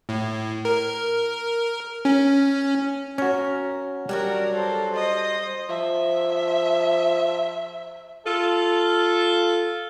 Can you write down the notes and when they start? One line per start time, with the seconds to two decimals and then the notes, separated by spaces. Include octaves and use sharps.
0.09 A2
0.65 A#4
2.05 C#4
3.18 C#4 F#4 A#4
4.09 F#3 G3 D4 F#4 A#4
4.55 A4 C5
4.95 C5 D#5
5.69 F3 E5
8.26 F4 A4